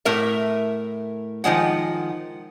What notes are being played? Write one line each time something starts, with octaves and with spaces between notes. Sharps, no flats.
A2 A3 A#4 E5
D#3 F3 G#3 F#5